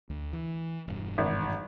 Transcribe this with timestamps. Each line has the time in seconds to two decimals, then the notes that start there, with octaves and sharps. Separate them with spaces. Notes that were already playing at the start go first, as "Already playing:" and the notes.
0.10 D2
0.33 E3
0.88 E1 G2
1.18 G#1